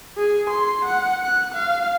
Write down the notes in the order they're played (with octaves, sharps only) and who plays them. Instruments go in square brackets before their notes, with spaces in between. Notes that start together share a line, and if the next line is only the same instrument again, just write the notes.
[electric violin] G#4
C6
F#5
F#6
F5